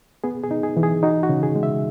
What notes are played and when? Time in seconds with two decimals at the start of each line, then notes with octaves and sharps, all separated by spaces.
0.24 B3 G#4
0.44 G#4
0.51 D#4
0.63 G#4
0.77 E3
0.83 G#4
1.03 D#4 F#4
1.23 F#4
1.29 C#3
1.43 G#4
1.56 G#3
1.63 E5